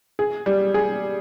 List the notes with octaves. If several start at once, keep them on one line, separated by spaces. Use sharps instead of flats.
G#4
G3
G#4